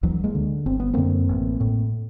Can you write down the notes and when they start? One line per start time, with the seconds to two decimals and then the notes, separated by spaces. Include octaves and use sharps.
0.03 D2 E3 F#3
0.24 G#3 A#3
0.35 D3
0.66 G1 C4
0.80 B3
0.94 F#2 D3 A#3 C4
1.29 A1
1.60 A2